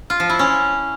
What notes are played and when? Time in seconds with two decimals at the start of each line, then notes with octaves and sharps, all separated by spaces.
0.10 F4
0.20 F3
0.29 E4
0.39 C#4